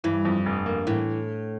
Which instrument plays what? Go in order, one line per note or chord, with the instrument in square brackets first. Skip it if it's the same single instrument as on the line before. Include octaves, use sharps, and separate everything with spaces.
[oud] G2 [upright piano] E3
[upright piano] F2
F1
A#3
[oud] A2 [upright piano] E3